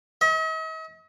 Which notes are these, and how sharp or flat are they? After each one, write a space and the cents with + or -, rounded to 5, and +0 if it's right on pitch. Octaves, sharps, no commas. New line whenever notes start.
D#5 +45